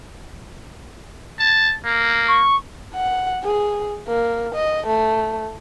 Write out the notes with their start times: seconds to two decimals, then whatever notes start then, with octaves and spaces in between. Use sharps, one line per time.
1.39 A5
1.85 A#3
2.28 C#6
2.95 F#5
3.44 G#4
4.08 A#3
4.55 D#5
4.87 A3